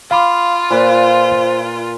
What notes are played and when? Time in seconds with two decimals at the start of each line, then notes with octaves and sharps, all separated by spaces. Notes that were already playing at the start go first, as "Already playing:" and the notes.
0.11 F4 F5 B5 D6
0.71 A#2 B4 C5